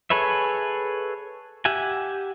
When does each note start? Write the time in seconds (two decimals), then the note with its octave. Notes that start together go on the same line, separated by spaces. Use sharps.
0.10 G#4 A4 B4 C#5 E5
1.65 G4 E5 F#5 G#5